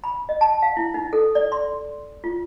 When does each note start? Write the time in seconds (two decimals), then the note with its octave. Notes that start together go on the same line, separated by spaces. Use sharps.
0.04 B5
0.29 D#5
0.41 A5
0.62 F5
0.77 E4
0.94 D#4
1.13 A4
1.35 D5
1.52 C6
2.24 F4